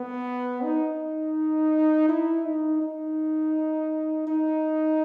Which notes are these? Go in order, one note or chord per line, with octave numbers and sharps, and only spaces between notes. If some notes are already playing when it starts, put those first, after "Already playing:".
Already playing: B3
D#4
E4
D#4
D#4
D#4